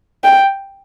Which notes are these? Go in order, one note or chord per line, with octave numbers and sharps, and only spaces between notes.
G5